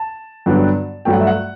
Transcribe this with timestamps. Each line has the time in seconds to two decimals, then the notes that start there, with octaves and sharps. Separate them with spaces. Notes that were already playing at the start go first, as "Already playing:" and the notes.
Already playing: A5
0.46 G2 D3 F#3 B3 D4
1.05 G2 F#3 A3 G5
1.13 F#5
1.20 E5
1.27 F#5